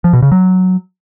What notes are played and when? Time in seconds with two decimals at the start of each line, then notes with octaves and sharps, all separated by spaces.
0.04 F3
0.13 B2
0.22 C#3
0.32 F#3